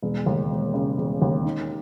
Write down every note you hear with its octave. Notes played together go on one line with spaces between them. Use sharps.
E1
D#2
E1
C#3
E1
D#2
D#4